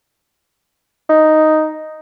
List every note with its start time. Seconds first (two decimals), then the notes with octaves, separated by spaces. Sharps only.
1.09 D#4